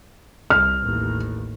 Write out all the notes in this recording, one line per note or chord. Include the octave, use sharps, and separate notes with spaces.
C2 F6
A1 D#2